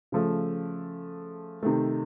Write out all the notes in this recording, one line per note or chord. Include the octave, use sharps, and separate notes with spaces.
C#3 F3 A3
C3 D#3 A3